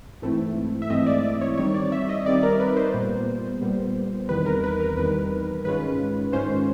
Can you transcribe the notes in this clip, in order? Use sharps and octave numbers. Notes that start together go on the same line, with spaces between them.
G#2 E3 A3 C4 E4
E5
G#2 E3 A3 C4 E4 D#5
D5
C#5
D#3 G3 C4 D#4 C#5
D5
E5
D#5
D#3 G3 C4 D#4 D5
A#4
B4
C5
A#2 G3 B3
A#2 G3 B3
E2 C3 D#3 G3 B4
A#4
B4
A#4
E2 C3 D#3 G3 B4
G#2 D#3 G#3 C#4 F4 B4
G#2 D#3 G#3 C#4 F4 C5